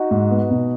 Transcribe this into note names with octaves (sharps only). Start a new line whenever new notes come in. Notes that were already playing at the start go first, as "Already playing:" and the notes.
Already playing: D#4 F#4
G#2
B3
B2